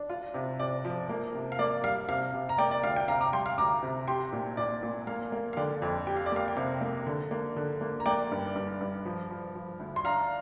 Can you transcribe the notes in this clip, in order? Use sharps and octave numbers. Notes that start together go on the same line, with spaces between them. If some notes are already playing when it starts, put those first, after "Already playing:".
Already playing: D4
F4
C3
C3 D5
F3
A#3
C3
F5
A#3 D5
G3 F5
C3 F5
C3
A#5
A#3 D5 G5
D5
D2 F5
G5
C3 F5 A#5
A#5 D6
G3 G5 C6
F5
D2 A#5 D6
C3
G4 G5 C6
A#2
A#2 D5
A#2
A#3 F5
A#3
F5
D3 D5 G5
F2
G4 G5
F5
D5
A#3 F5
G5
C3 F5
A#3
D3
A#3
D3
A#3
A#5
A#3 D5 G5
G2
G2
G2
F3
F3
F3
D2
C6
D4 F5 A#5